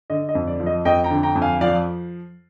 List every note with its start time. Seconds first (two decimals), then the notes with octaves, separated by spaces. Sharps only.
0.10 D3 D#5
0.29 D#5
0.35 F2
0.47 D5
0.60 F3
0.66 D#5
0.85 F2 D#5 G5
1.04 G5 A#5
1.11 D3
1.23 G5 A#5
1.35 F2
1.42 F5 G#5
1.61 F3 D5 F5